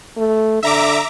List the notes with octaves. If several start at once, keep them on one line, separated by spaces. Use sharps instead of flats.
A3
D3 E5 A#5 D6